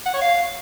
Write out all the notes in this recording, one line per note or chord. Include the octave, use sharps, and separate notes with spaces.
F#5
C#5
F5